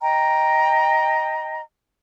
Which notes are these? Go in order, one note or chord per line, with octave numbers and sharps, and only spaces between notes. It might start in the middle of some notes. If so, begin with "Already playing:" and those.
D#5 G5 A#5